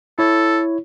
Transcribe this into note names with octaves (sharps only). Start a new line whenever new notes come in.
E4 A4 C#5